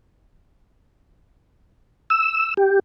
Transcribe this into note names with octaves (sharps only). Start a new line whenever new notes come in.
E6
G4